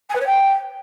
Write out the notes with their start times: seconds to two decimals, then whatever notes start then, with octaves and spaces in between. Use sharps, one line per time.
0.09 G#5
0.15 B4
0.21 C#5
0.26 G5